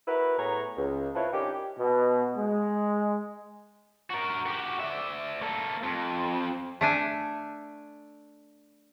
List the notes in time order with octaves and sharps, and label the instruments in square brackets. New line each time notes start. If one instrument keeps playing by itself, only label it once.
[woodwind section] E4 F#4 A#4 B4
A2 B3 G#4 C#5 A#5
C#2
C4 E4 F4 A4 B4 C#5
G2 D#3 C#4 G4
[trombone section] B2
G#3
[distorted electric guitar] F#4 A#4
F#4 G4
D5 E5
A#3 A4
F2
[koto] A3 D4 G#5